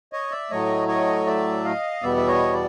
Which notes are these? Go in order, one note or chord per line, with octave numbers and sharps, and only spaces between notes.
C#5 D#5
D5 E5
A2 F#3 A3 C#5 D#5
C#5 D#5
D5 E5
D#5 F5
E2 B2 G3 B3 D5 E5
E5
C#5 D#5
D5